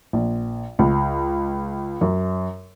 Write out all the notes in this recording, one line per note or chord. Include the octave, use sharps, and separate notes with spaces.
A#1
C#2
F#2